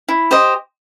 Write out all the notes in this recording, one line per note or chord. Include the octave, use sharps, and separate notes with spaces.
E4
G4 C5 D#5